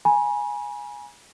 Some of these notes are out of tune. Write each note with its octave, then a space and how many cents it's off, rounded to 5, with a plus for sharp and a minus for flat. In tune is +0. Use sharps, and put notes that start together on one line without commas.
G#5 +0 B5 -45